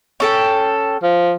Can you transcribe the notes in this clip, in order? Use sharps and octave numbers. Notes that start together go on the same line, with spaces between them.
C#4 A4 G5
F3